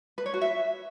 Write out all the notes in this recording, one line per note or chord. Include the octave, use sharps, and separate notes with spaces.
B4
C#5
F#4
E5